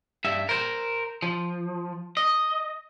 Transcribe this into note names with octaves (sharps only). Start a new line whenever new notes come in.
G2 E5
A#4 C5
F3
D#5